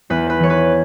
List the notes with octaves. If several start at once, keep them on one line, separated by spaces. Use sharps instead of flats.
E2 B4
B4
E3 C#5
B4